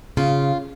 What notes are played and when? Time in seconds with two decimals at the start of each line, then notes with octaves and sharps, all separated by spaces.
0.17 C#3 F4